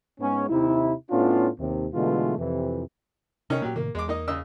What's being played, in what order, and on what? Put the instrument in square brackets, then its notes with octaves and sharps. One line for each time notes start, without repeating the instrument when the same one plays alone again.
[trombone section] G#2 G#3 B3 C#4
D#2 C3 D#4 E4
A2 B3 C#4 D4 F4
D#2 C3
B2 D3 E3 G#3 A3 F4
F2 C3 E3
[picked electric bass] C3 [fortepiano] D#3 C#4 D#4
[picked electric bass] A#2 A#3 [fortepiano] F#3 G4
[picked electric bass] A2 C3 D#3 [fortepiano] A#3
[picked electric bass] E2 [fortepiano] G#3 D6
[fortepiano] A#3 D#4 D#5
C#3 D#5 E6